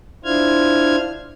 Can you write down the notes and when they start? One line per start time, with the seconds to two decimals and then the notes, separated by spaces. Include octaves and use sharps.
0.24 D4 E4 F4 C5 F6 G#6